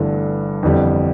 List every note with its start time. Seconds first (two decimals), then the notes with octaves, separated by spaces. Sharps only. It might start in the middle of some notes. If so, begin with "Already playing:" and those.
Already playing: G1 G2 E3 A3
0.63 G1 F2 E3 G3